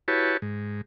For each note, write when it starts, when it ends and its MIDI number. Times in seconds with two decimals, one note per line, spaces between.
0.08 0.37 64
0.08 0.37 66
0.08 0.37 67
0.08 0.37 71
0.08 0.37 73
0.08 0.37 81
0.42 0.81 44